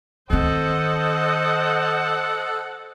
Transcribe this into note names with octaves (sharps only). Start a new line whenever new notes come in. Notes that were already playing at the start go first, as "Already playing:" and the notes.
D#3 C4 A4 C5 D#5 F#5